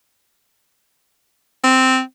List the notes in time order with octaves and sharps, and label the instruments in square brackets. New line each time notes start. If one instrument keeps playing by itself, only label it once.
[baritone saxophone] C4